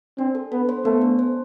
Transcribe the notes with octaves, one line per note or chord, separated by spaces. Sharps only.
C4 D4
A4
B3 A4
C5
A3 B3
D4
C5